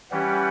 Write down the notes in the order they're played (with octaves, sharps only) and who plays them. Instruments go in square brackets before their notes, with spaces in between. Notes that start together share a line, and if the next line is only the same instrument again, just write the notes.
[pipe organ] E3 G3 C#4 G4 B4 [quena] F#5